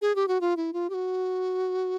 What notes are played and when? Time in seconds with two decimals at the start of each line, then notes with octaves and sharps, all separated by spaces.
0.02 G#4
0.16 G4
0.28 F#4
0.41 F4
0.57 E4
0.73 F4
0.90 G4
0.94 F#4